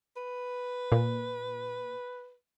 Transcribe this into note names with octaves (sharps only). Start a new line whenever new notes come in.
B4
A#2